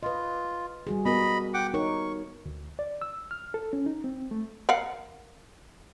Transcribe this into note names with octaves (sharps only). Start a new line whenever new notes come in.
F4 B4 D#5
G3 F#4 G#4
B3 F#4 A#4 D#5 B5
F#5 G5 D6
D#4 A#4 C#5 C#6
D2
D5
E6
F6
A4
C#4
D#4
C4
A3
A#4 F5 F#5